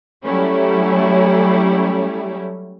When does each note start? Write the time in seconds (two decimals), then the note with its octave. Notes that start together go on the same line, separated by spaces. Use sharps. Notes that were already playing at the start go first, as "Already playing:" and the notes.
0.23 F#3 G3 A3 C#4 E4